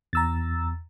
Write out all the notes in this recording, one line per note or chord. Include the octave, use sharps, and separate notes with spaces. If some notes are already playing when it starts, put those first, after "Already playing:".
E2 A#5 E6 A6